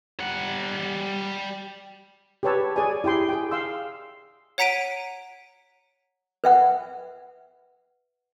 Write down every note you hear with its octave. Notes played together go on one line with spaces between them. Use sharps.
G3 F#5
G4 G#4 B4 C#5 A5 E6
G#4 C#5 D5 G#5
E4 G4 G5 C6
G#4 G5
F5 C6 E6
C#5 F#5 A#5 B6 D7 D#7
B4 E5 F#5